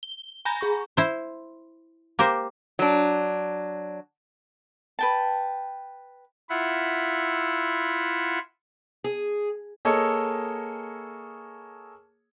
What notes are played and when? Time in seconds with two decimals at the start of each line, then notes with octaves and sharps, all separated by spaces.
0.03 G7
0.45 G#5 A#5 B5 G6 A#6
0.61 G#4 C#6
0.97 E4 C5
2.19 A#3 G4 A#4 C5
2.79 F#3 D4
4.99 B4 G5 A5
6.50 E4 F4 E5 F#5
9.04 G#4
9.85 A#3 G#4 A4 C#5 D#5